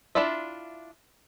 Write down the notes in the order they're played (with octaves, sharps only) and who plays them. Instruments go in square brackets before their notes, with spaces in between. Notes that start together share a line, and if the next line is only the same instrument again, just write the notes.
[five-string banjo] D4 E4 F4 D5 E5